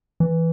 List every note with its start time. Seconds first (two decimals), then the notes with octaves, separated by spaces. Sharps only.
0.20 E3